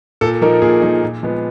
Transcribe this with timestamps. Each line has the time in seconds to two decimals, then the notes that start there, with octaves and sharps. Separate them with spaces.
0.21 A#2 A4
0.42 F3 A#3 D#4 A#4
0.62 A#2 G#4
0.82 F3 A#3 D#4
1.02 A#2
1.23 F3 G#3 B3